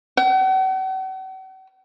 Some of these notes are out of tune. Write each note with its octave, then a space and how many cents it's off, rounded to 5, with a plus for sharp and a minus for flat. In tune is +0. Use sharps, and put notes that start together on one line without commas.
F#5 +45